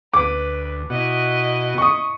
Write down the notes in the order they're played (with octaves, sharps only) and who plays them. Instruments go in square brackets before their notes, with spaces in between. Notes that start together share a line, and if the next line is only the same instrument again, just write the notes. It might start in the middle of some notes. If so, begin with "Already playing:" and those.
[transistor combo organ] D2 [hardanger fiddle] B4 [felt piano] D6
[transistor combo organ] B2 F#4 [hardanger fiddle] E4 D#5
[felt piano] C#6 D#6